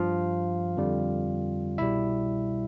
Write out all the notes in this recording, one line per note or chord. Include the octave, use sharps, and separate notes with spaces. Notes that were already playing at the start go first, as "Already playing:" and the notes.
Already playing: G2 F3 F4 F5
F2 D3 G3
C2 B2 G3 E4 E5